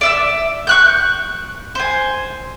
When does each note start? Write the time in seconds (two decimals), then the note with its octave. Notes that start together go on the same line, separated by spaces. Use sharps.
0.01 D5 E5 E6
0.67 C#6 F#6 G6
1.75 C5 G#5